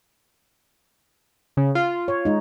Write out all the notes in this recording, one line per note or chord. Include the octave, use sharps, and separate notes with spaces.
C#3
F4
C#5
G#3 D#4